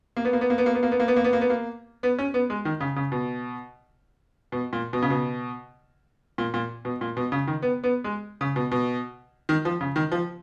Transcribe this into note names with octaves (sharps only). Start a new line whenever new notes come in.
A#3
B3
A#3
B3
A#3
B3
A#3
B3
A#3
B3
A#3
B3
A#3
B3
A#3
B3
A#3
B3
C#4
B3
G#3
D#3
C#3
C#3
B2
B2
A#2
B2
C#3
B2
A#2
A#2
B2
A#2
B2
C#3
D#3
B3
B3
G#3
C#3
B2
B2
D#3
F3
C#3
D#3
F3